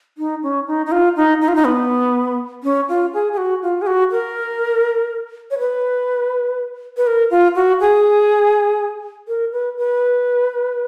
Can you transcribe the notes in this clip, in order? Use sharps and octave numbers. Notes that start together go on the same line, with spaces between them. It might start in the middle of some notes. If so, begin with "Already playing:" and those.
D#4
C#4
D#4
D#4
F4
D#4
D#4
F4
D#4
B3
C#4
F4
G#4
G#4
F#4
F4
G#4
F#4
A#4
C#5
B4
B4
A#4
F4
F#4
G#4
A#4
B4
B4